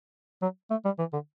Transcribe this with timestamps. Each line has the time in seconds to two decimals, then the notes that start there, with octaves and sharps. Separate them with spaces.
0.42 F#3
0.71 A3
0.85 G3
0.99 E3
1.13 D3